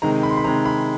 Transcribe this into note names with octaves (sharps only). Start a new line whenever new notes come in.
C3 D#3 G#3 A#5
B5
C6
B5
C3 D#3 G#3 A#5
B5